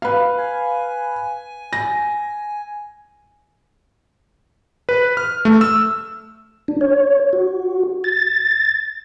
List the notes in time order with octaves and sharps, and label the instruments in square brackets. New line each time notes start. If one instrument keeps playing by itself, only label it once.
[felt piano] B4 F5
[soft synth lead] G#5
[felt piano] A#6
[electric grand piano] B4
F6
A3
E6
[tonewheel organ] D4
C#5
F#4
A6